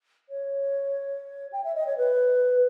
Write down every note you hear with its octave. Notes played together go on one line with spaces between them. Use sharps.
C#5
G5
E5
D#5
C#5
B4